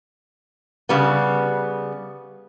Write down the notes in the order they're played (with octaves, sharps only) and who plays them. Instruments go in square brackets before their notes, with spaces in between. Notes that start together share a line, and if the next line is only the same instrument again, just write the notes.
[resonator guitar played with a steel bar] C#3 G3 B3